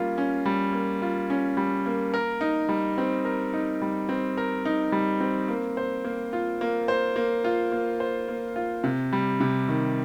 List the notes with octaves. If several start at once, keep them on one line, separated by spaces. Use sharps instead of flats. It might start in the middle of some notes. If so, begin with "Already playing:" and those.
Already playing: G3 A#3 C#4 F4
C#4
G3
A#3
F4
C#4
G3
A#3
A#4
D#4
G3
C4
A#4
D#4
G3
C4
A#4
D#4
G3
C4
A#3
C5
A#3
F4
A#3
C5
A#3
F4
A#3
C5
A#3
F4
C3
G3
C3
D#3